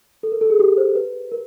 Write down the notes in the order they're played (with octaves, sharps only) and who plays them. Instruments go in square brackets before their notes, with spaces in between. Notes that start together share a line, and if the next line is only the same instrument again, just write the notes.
[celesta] A4
A#4
A4
G#4
G4
C5
B4
A#4